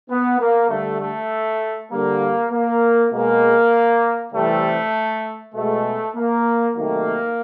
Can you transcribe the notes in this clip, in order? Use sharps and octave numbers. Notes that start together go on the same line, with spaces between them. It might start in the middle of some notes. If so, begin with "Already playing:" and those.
B3
A#3
D3 G3 A3
A3
D3 G3 A#3
A#3
B2 G#3 A#3
C3 E3 G3 A3
B2 G#3 A3
A#3
C3 D#3 F#3 A3 A#3